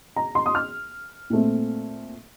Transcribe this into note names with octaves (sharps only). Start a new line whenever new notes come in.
A#5
C6
D#6
F6
A#2 A3 C4